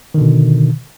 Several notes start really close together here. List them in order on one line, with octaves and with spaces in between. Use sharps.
D#3 D3 B2